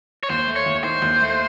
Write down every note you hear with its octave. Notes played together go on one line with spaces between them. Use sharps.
C#5
D#2 C5
A3
C#5
D#2
D#3 C5
D#2
A3